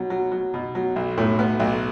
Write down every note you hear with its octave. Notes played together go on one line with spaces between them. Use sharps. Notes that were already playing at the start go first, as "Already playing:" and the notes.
Already playing: B2 F#3
F#3
F#3
B2
F#3
B1
A2
B3
B1